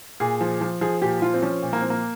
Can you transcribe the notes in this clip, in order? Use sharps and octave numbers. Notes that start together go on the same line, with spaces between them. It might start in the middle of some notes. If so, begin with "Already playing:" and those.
A#2 G#4
F3
F3
F3 G#4
A#2 G4
F3 F4
C4
F3 C#4
A#2
A#3
F3 C4
A#3